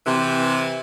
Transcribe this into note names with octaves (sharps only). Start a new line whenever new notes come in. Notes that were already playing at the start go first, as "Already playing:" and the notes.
C3 E3